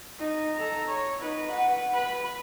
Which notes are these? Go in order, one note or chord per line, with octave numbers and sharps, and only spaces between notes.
D#4
A4 A#5
C#5
D#4 B4
B4 F#5
B4 B5